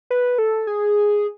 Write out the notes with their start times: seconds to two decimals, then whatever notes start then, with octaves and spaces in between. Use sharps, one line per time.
0.10 B4
0.38 A4
0.67 G#4